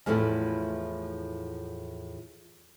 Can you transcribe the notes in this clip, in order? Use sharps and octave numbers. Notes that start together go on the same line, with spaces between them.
E2 A2 F3 A3 E4